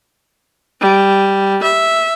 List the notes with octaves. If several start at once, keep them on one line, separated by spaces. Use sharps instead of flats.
G3
E5